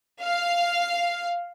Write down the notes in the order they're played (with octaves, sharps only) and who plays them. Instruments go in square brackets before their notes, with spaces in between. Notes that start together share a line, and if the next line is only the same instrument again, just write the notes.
[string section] F5